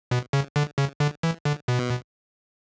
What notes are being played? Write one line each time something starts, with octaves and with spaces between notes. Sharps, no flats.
B2
C#3
D3
C#3
D3
E3
D3
B2